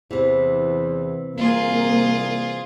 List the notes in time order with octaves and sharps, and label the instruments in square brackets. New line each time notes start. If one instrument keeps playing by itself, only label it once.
[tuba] E2 [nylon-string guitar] C3 E3
[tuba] C2 [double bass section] A#3 [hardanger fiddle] F4 G#4